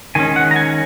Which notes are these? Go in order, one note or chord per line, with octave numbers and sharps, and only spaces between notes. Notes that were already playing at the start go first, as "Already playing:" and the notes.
D#3 G#3 C#4 G#5
F#5
A#5
G#5